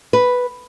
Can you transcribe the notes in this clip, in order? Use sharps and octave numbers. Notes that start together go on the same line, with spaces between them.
B4